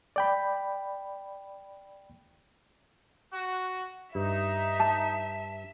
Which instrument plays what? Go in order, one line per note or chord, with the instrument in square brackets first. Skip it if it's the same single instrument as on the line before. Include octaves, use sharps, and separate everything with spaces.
[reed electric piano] D5 G5 B5
[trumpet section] F#4
[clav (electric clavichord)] G2 [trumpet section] D#4 [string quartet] E5
[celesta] A5